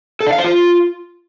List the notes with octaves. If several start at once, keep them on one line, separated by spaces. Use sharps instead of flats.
A4
D4
F5
C5
F4